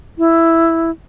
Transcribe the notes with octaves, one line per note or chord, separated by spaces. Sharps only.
E4